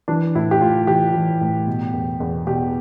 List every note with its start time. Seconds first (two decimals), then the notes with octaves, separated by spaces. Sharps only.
0.08 E3 D4
0.35 A2 E4
0.51 G4
0.61 A2 F4
0.87 E3 G4
1.14 E3
1.41 A2
1.67 B2
1.94 E2
2.20 E2
2.46 B2 G4